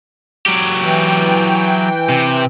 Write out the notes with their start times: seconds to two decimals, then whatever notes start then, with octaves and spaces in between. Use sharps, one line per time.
0.46 F#3 G4
0.83 E3 G5
2.10 C3